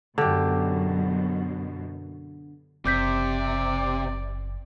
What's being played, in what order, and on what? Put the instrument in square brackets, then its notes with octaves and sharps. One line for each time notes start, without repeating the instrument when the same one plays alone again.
[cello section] F#2 B2 [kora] D3 G4
[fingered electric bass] F#1 [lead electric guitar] C3 [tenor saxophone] D5 [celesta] D6 G6 B6